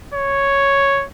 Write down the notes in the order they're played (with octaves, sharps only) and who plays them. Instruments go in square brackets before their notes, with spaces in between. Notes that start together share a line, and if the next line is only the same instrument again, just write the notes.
[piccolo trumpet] C#5